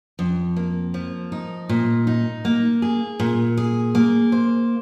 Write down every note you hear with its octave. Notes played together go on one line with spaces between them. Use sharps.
F2
A#3
F3
D#4
A#2
D#4
A#3
G#4
A#2
G#4
A#3
C5